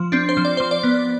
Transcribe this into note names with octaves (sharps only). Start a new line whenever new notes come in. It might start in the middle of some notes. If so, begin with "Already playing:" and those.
Already playing: F3
C4 D4
C5
F3
D5
F3 C5
D5
B3